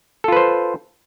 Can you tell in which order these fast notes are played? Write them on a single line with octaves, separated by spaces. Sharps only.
A4 F4 B4 C5